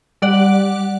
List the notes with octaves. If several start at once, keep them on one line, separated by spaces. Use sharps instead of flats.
G3 D5 F#5